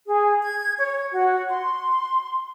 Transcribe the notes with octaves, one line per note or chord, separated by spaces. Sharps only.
G#4
G#6
C#5
F#4
C6